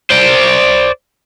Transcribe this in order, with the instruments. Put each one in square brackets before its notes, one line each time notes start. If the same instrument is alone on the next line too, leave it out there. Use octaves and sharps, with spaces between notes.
[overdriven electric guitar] C5 D5